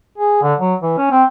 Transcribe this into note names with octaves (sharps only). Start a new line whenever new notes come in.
G#4
D3
F#3
E3
C#4
C4